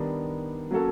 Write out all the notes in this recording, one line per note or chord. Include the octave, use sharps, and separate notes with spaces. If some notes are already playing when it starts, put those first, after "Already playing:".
Already playing: D#3 G3 B3 D4
F#3 A#3 C#4 F#4 A4